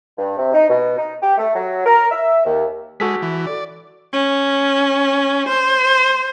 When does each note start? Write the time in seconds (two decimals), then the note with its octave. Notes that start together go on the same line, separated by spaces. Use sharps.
0.18 G2
0.38 C3
0.53 D#4
0.69 B2
0.98 D#4
1.21 G4
1.38 A3
1.55 F#3
1.86 A#4
2.11 E5
2.45 D#2
3.00 G#3 F#4 A4 B6
3.22 E3
3.47 D5
4.13 C#4
5.48 C5